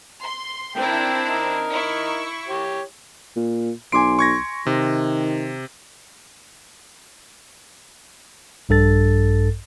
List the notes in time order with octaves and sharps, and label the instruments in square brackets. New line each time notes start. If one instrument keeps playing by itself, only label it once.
[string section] C6
[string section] C4 D4 E4 [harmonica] A#4 G5
[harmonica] D#4 A#4
[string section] E4 C#6
[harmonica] G4 C#5
[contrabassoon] A#2
[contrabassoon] B1 [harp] G#5 C6 [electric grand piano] D6 D7
[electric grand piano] C#6 G#6 A#6
[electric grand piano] C3 [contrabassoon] D#3
[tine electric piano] A#1 G2 A4 A6